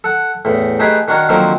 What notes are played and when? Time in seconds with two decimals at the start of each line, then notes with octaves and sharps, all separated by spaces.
0.04 A4 F#5
0.45 E2 A2
0.80 A3 D#4 G4 G#4 B4 G#5
1.08 D#3 D4 F#4 A#4 C#5
1.29 D3 D#3 F3 F#3 A#3 C4